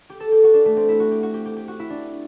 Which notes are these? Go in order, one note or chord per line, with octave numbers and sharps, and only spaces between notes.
G4
A4
G4
F#4
D4
A3
C4
E4
F#4
G4
F#4
G4
G4
G4
F#4
E4
D4